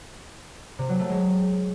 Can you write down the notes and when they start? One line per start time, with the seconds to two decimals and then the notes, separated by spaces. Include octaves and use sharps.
0.79 C3
0.89 F#3
0.99 A3
1.10 G#3